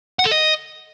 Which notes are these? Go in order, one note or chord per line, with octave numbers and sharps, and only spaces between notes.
F#5
A4
D#5